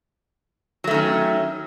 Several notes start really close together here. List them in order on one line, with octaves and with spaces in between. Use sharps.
F#3 A3 D#3 C#4